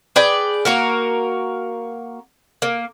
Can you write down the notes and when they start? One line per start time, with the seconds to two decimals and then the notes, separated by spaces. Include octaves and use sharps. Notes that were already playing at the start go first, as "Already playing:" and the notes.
0.16 G#4 B4 D5 G5
0.65 A#3 F#4 A#4
2.62 A#3